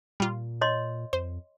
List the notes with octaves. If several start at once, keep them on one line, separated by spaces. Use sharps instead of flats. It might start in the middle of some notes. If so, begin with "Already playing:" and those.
A#2 G3 F4
C#5 D#5 C6
F2 C5